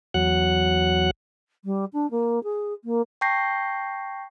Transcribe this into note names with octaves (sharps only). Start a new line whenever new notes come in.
E2 F#3 F#5 F#6
G3
D4
A#3
G#4
A#3
G5 A5 C#6 G6 A#6 C7